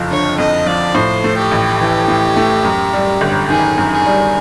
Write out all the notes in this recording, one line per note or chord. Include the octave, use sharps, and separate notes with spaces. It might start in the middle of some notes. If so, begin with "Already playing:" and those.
Already playing: F#1 F2 F3
D3 C#5
F2 D#5
F3 D5
A2 C5
A3
G4
A1
E3
A2
A3
F#2
G3
G1
D#3 G#4
F#2
G#4
G3